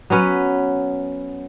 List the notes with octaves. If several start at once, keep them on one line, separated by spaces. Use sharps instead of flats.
F#3 B3 C#4 B4